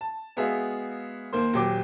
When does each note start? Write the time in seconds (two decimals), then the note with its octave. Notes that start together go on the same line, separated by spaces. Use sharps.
0.01 A5
0.37 G#3 B3 F#4 G#4 E5 F5
1.33 D#2 A#3 C5 C6
1.54 D#1 F#3 G4 G5 D6